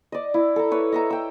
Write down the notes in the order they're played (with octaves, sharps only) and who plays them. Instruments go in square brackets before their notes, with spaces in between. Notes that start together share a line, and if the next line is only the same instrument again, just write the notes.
[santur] D5 D#5
E4
A4 A#5
B4 C#5 E5
D#5 E5 A#5
G5 E6